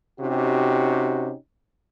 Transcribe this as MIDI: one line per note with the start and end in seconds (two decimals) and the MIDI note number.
0.21 1.34 48
0.21 1.34 61
0.21 1.34 63
0.21 1.34 66
0.21 1.34 67